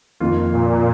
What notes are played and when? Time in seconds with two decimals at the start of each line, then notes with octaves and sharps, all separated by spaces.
0.20 F2 D#3 A#3 F4
0.52 A#2